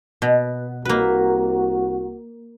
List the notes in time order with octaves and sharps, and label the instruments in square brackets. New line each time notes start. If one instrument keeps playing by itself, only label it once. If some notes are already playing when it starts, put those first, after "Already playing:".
[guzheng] B2
[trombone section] C2 F#4 [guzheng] A#3 B4